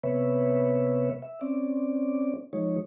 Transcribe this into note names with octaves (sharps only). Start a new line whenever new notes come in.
C3 B3 B4 C#5 E5
E5
C4 C#4 D5
F3 G#3 D#4 C#5